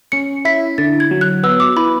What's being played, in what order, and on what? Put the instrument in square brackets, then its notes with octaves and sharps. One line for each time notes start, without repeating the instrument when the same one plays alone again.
[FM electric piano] C#4 [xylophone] C#7
[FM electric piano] E4 [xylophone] B6
[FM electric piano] D3 [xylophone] A6
[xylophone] G#6
[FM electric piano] F#3
[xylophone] F#6
[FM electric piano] B3 [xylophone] E6
[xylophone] D6
[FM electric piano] E4 [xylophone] B5